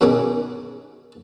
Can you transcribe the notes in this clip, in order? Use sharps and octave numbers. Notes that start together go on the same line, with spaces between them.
B2 D#3 C#4 G#4 D6